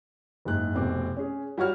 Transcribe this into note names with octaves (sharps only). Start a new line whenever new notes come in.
F#1 G#2 F#6
F1 B2 C4 D6
C#4 G#4
G3 F#4 C#5 F6